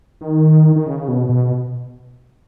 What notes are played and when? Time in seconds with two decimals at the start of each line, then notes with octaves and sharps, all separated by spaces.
0.21 D#3
0.76 D#3
0.86 C#3
1.08 B2
1.29 B2